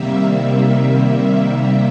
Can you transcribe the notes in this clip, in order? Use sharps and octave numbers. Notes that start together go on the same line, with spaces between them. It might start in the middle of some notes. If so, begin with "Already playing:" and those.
Already playing: C3 D#3 G3 A#3 E5
E5